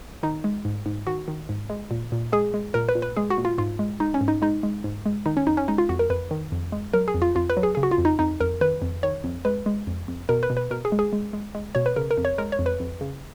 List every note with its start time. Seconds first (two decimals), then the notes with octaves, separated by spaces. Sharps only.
0.23 D#3 D#4
0.44 G#3
0.65 G#2
0.86 G#2
1.07 D#3 F#4
1.28 D#3
1.49 G#2
1.70 G#3
1.91 A#2
2.12 A#2
2.32 G#3 G#4
2.54 G#3
2.74 A#2 A#4
2.89 B4
2.95 A#2
3.02 B4
3.17 G#3 G#4
3.30 F#4
3.38 A#2
3.45 F4
3.58 G#2 F4
3.79 G#3
4.00 G#3 D#4
4.14 C#4
4.21 G#2
4.28 D#4
4.42 G#3 D#4
4.63 G#3
4.84 G#2
5.06 G#3
5.26 D#3 D#4
5.37 C#4
5.47 F2 D#4
5.57 C#4
5.68 G#3 D#4
5.78 F4
5.89 F2 F#4
5.99 A#4
6.10 F2 B4
6.31 D#3
6.52 F2
6.72 G#3
6.93 F#3 A#4
7.08 G#4
7.14 F2
7.22 F4
7.35 F2 F4
7.50 B4
7.57 F#3
7.63 G#4
7.75 C#3 G#4
7.83 F#4
7.91 F4
7.98 F2
8.05 D#4
8.19 F2 D#4
8.40 F2 A#4
8.61 D#3 B4
8.82 F2
9.03 D#3 C#5
9.24 F2
9.45 G#3 B4
9.66 G#3
9.87 F2
10.08 F2
10.29 B2 A#4
10.43 B4
10.50 B2
10.57 B4
10.71 B2 A#4
10.85 G#4
10.92 G#3
10.99 G#4
11.13 G#3
11.33 G#3
11.55 G#3
11.75 B2 C#5
11.86 B4
11.96 C#3 A#4
12.11 A#4
12.17 F2
12.25 C#5
12.38 G#3 A#4
12.52 C#5
12.59 F2
12.66 B4
12.80 F2
13.01 C#3